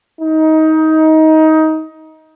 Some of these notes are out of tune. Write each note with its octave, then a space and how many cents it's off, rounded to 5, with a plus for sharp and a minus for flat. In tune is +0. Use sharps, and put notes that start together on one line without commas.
D#4 +20